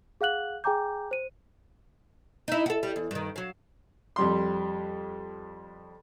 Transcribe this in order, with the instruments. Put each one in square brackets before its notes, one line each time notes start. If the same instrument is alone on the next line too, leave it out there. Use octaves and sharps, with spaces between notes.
[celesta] G#4 F5 F#5 F#6 F#7
G#4 G5 G#5 A#5 D6 G6
C5 D#7
[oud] D#4 E4
F#4 A4
G3
E2
G2 D#3
F#3 F5
[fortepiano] F2 G3 C6